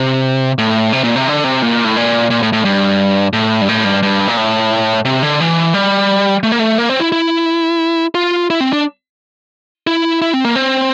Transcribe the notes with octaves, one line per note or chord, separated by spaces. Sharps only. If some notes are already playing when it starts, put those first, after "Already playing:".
Already playing: C3
A2
C3
A#2
C3
D3
C3
A#2
A2
A#2
A#2
A2
A2
G2
A2
G2
A2
G2
G2
A#2
A2
C3
D3
E3
G3
A3
A#3
A3
A#3
C4
E4
E4
F4
E4
C4
D4
E4
E4
C4
A#3
C4